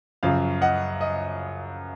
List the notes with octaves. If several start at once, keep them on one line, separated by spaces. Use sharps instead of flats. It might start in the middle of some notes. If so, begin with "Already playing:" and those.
F#2 C#3 F3 F5
D#5 F#5
D#5